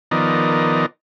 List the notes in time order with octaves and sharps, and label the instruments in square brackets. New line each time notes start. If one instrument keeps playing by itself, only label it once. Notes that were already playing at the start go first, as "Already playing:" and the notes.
[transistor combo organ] D#3 F3 B3 A#4 D5 D#5